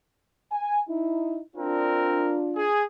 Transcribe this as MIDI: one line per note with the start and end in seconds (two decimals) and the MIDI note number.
0.51 0.80 80
0.88 1.40 63
0.88 1.40 64
1.56 2.37 60
1.56 2.67 62
1.56 2.67 65
1.56 2.37 70
2.55 2.82 68